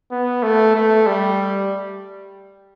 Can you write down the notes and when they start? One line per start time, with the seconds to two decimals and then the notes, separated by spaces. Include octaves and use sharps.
0.11 B3
0.43 A3
0.75 A3
1.07 G3